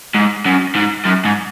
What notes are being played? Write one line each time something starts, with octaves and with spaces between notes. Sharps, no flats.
G#2
F#2
G#2
F#2
G#2